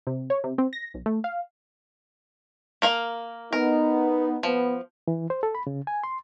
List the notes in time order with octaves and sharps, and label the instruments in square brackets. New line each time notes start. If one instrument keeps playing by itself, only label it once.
[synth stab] C3
C#5
C3
C4
A#6
B1
A3
F5
[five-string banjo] A#3 A#4 F5
[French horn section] B3 D#4 [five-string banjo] A#4
[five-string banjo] F3 [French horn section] B3
[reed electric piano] E3
C5
A4
B5
C#3
G#5
C6